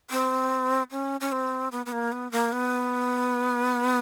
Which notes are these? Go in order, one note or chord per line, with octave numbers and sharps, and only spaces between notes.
C4
C#4
C#4
C4
B3
B3
A#3
B3
A#3
B3